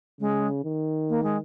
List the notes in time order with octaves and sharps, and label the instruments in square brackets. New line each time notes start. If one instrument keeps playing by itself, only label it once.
[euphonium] C#3 [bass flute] G#3
[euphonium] D#3
[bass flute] A#3
G#3